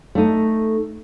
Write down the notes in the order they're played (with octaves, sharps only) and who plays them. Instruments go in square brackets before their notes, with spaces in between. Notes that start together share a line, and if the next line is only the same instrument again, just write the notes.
[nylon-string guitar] A3 D#4